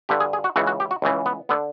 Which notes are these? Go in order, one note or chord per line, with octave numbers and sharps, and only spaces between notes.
G2 D3 G4
G#4
G#4
F#4
C#2 C#3 E3 F#4
F#4
G4
F#4
C#2 C#3 E3
B3
D3 B3